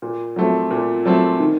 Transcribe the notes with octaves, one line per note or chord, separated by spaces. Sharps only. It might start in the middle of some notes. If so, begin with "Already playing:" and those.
A#2
F#3 A3 C4
A#2
F#3 A3 C4
D#3